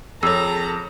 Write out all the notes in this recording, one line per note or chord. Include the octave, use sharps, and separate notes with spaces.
F2 G#4 A4 C#5 A#5 E6